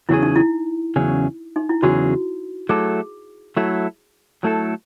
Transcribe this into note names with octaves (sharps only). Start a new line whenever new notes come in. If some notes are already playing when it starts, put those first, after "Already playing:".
E2 C#3 F#3 C#4 E4 G#4
D#4
E4
E2 C#3 F#3 C#4 G#4
D#4
E4
E2 C#3 F#3 C#4 F#4 G#4
F#3 A3 E4 G#4 A4
F#3 A3 E4 A4
F#3 A3 E4 A4